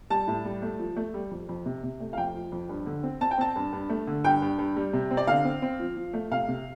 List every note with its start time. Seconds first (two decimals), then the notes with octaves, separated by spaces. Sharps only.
0.10 G3 A5
0.28 A2
0.45 G3
0.62 A3
0.79 F3
0.96 A3
1.14 G3
1.31 F2
1.49 F2
1.65 C3
1.83 C3
2.00 A3
2.13 F5
2.17 F2 G5
2.34 F3
2.52 F2
2.69 G2
2.86 D3
3.03 C4
3.21 C4 A5
3.31 G5
3.38 C4 A5
3.56 G2
3.73 G2
3.89 A3
4.07 D3
4.24 G2 G5
4.42 G2
4.58 G2
4.76 G3
4.93 C3
5.11 C4
5.17 D5
5.27 D3 F5
5.45 C4
5.62 C4
5.79 F3
5.97 F3
6.13 A3
6.31 C3 F5
6.48 C3